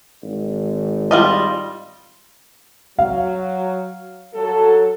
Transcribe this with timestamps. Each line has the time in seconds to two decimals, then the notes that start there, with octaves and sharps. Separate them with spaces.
0.23 G#1
1.11 G3 F4 D#5
2.99 F#3 F5
4.34 F#3 A4